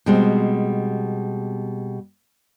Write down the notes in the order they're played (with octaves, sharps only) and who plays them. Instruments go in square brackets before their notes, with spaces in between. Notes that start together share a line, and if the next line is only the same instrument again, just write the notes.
[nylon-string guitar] B2 G3 G#3 C4